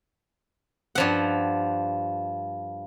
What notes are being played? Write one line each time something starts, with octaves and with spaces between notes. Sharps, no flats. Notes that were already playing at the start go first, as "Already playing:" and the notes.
G2 F3 F#5